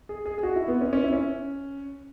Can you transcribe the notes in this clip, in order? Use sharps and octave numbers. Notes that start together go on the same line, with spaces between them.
G#4
G#4
G#4
F#4
E4
B3
C#4
C#4
E4
C#4